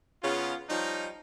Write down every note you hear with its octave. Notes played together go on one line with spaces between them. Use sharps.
C#3 B3 C#4 F4
F3 G3 C#4 D#4